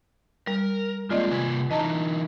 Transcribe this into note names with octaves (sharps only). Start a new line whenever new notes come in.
G3 A#4
G#3 A#3 C4 F4 D5 D#5
C3 B4 G#5
E3 D#4 E4 D#5 A5 A#5